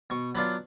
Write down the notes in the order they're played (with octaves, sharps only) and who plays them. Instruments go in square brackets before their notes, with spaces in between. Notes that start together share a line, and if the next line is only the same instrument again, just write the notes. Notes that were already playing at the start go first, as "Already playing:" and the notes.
[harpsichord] B2 C#6
F#3 B3 D4 F4 B5